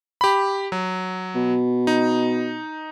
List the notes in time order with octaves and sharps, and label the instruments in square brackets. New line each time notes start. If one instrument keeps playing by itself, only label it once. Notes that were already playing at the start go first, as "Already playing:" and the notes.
[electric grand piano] G4 B5
F#3
[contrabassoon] B2
[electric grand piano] D#4